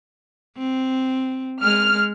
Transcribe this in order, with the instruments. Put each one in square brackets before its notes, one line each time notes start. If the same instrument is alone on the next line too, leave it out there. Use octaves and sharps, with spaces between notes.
[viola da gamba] C4
[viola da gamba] G#3 [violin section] F6